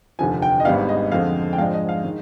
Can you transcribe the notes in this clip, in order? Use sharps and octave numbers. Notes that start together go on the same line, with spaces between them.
F1 D#2 D3 F3 G#5
G5
D#5
G#1 G#2 G3 B3 D4 F5
D#5
F2 D3 G#3 C4 F5
G5
G#2 F3 G#3 D4 F5
D#5
F5
D#3 G#3